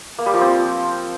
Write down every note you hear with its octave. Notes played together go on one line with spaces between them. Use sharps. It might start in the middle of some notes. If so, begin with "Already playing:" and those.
A#3
G3
F3
C4